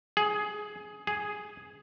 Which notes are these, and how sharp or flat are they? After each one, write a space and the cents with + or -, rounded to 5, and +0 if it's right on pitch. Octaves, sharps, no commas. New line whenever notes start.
G#4 +10
G#4 +0